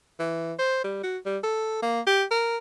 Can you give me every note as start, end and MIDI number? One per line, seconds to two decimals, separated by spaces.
0.19 0.53 52
0.59 0.79 72
0.84 1.01 55
1.03 1.18 66
1.26 1.38 55
1.43 1.81 69
1.82 2.00 58
2.07 2.24 67
2.31 2.57 70